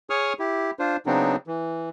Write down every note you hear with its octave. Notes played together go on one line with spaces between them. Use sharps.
G#4 C#5 C#6 D#6 F6
E4 G4
D4 F4 C5
C#3 F#3 B3 C4 D4 D#4
E3